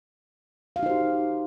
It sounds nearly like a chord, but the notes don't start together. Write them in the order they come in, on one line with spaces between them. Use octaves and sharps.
F5 F#4 D#4 C5 G4